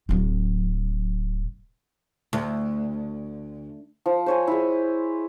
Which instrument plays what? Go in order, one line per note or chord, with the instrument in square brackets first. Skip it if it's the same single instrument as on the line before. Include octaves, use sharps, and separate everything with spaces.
[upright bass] D1 F#3
[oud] D2
[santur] F3
C5 C#5 G#5
G#3 E4